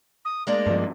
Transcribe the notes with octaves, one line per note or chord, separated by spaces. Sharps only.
D#6
G#3 A#3 D4 D5
G2 F3